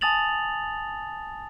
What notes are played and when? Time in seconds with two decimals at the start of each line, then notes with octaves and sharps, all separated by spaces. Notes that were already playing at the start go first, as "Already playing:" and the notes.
0.01 G#5 A5 D#6 A6 F7 F#7